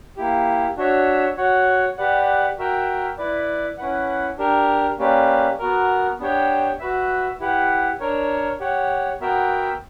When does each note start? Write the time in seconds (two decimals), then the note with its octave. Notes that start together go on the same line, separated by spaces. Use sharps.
0.17 A#3 E4 G4
0.77 D4 F#4 C#5 E5
1.37 F#4 C#5 F#5
1.97 G4 B4 D5 F#5
2.58 F#4 A#4 E5 G5
3.18 E4 B4 D5
3.78 C#4 E4 B4 F#5
4.38 D4 G4 A#4
4.99 A#3 C#4 G4 B4 D5
5.58 B3 F#4 A#4
6.19 B3 D4 G4 C#5 G5
6.79 F#4 B4 E5
7.40 E4 G4 B4 F#5
8.00 D4 A#4 C#5
8.60 G4 C#5 F#5
9.20 B3 F#4 A#4 E5 G5